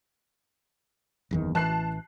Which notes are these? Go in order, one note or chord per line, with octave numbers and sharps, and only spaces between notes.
F#1 E2 D#3
A1 E3 A5 F#6 C7